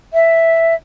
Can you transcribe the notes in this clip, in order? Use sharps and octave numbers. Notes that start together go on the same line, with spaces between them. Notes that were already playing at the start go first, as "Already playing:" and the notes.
E5